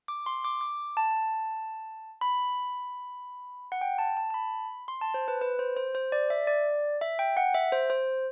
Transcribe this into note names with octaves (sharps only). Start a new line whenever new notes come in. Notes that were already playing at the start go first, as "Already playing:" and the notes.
D6
C6
D6
D6
A5
B5
F#5
G5
A5
A5
A5
B5
C6
A5
C5
B4
B4
C5
C5
C5
D5
E5
D5
E5
G5
F#5
E5
C5
C5